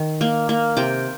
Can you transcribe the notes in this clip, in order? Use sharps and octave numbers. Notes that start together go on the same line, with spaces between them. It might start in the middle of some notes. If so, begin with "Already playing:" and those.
Already playing: D#3
A#3
A#3
C3 G5